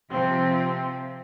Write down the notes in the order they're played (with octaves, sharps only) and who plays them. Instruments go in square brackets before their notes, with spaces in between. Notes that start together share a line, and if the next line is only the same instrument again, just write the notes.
[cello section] C3 F3 [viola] C4